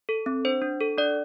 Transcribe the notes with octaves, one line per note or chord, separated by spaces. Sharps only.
A4
C4
D4 C5
D4
A4
D4 D5